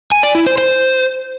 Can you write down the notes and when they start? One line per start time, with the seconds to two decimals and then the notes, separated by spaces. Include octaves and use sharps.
0.12 G#5
0.23 D5
0.35 E4
0.46 C5
0.58 C5